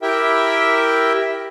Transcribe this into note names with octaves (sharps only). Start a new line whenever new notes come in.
E4 G4 A#4 E5 G5